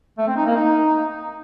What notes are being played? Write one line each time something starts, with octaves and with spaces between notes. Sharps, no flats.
A3
C4
D#4
A#3
D#4